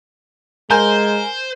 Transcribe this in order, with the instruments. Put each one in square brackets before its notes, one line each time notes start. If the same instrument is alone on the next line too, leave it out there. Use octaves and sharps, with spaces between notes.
[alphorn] G#3 [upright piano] A#4 G#5 G6 [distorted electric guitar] C5 [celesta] F5 A#5 C6